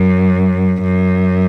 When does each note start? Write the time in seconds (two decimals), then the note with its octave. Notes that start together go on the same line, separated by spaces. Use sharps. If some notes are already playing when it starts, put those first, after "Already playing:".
Already playing: F#2
0.82 F#2